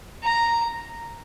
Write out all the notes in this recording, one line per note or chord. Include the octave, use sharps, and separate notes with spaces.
A#5